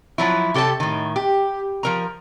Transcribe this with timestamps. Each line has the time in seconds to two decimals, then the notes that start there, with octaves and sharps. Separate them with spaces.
0.18 F3 F#3 E4
0.54 C3 G4 A4 C#5 A5
0.80 A2 D#3
1.16 G4
1.83 F3 A#4 A#5